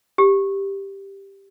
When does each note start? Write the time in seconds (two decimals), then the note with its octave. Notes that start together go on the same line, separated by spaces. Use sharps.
0.18 G4